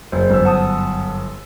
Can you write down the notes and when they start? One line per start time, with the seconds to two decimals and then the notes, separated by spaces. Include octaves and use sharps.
0.12 F#1 C5
0.30 G1 F#2 E6
0.45 F#5 A5 D#6